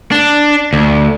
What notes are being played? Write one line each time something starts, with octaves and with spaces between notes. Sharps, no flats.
D4
D2